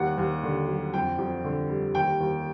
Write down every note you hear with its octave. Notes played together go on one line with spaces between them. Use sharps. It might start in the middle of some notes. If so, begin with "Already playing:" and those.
Already playing: D#2 G3 F#5
D#2
D3
F#3
F2 G5
F2
D3
G3
D#2 G5
D#2